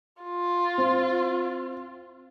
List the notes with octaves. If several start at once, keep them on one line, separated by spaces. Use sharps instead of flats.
F4
C4